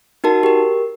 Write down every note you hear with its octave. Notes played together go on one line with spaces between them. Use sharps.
D#4 F#4 A#4 A5
G4 A#4